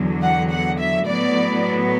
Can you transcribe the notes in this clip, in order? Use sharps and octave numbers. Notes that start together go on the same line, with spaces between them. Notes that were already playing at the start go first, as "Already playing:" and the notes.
Already playing: E2 D3 F#3
F#5
F#5
E5
A2 F#3 B3 D5